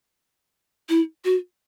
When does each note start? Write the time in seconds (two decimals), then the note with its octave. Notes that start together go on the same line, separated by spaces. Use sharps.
0.89 E4
1.25 F#4